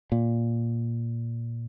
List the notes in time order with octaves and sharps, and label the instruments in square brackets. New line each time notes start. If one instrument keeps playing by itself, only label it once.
[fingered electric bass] A#2